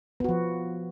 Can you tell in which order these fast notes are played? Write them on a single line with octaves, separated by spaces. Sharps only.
B3 F#4 F3